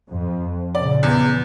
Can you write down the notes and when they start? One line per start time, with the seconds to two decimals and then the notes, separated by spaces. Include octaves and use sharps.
0.10 F2
0.75 A#2 C#3 D5
1.03 E2